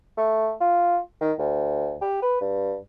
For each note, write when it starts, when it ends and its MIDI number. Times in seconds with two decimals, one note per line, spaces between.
0.17 0.52 57
0.61 0.99 65
1.21 1.32 51
1.39 1.95 38
2.01 2.20 67
2.23 2.39 71
2.41 2.77 43